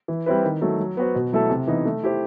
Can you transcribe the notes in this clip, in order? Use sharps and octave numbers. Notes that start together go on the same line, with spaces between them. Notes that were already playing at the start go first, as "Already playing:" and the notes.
E3
G3 C4 E4 B4
D#3
F#3 A3
F#3
B3 F#4 C5
B2
F#3 A3 E4 A4
C3
E3 B3 D#4
A3
E4 G4 C5